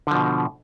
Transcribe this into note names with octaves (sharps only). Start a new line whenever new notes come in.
B2 D3 F3